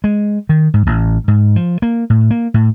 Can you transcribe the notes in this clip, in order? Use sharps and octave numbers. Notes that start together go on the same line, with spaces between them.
G#3
D#3
G#2
A1
G#2
F3
A#3
A2
A#3
A2